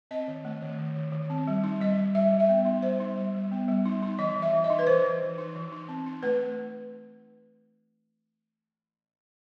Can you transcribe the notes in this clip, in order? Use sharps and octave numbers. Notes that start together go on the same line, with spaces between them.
C4 D#5
D#3
A3
D#3
D#3
D#3
D#3
C4
G3
D#4
G3 D#5
G3
G3 E5
G3
E5
B3
D#4
G3 C5
D#4
G3
G3
B3
G3
D#4
D#4
E3 D#5
E3
E5
E3
D#5
D#4
B4
E3 C5
E3
E3
D#4
E3
D#4
C4
D#4
A3 B4